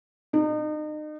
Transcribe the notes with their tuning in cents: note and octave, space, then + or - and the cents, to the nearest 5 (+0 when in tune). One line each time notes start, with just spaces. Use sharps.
D#4 -35